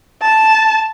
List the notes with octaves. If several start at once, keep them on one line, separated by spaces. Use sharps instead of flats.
A5